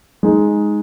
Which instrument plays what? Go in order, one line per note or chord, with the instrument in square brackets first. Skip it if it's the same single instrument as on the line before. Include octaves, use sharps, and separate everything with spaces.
[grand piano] G#3 D#4 G#4